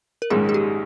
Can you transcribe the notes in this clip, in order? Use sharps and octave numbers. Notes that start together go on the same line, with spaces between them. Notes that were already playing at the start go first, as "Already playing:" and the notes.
A#4
A#1 G#2 D#3 G#3 C#4 G#4
G#4
G4